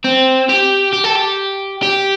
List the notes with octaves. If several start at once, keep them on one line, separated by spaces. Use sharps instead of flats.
C4
G4
G4
A4
G4
G4